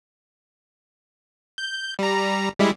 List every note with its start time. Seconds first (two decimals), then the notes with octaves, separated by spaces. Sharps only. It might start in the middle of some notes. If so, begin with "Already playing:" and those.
1.58 G6
1.99 G3 A#5
2.59 G3 G#3 E4